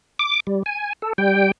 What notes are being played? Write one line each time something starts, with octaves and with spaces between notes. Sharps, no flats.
D6
G3
G#5
A4
G3 G5